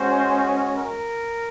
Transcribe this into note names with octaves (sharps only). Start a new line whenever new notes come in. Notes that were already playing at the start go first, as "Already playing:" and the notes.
Already playing: G#3 C#4 F#4 C5
A#4